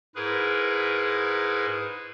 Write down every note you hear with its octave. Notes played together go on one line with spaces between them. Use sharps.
G#2 E4 G#4 A#4 B4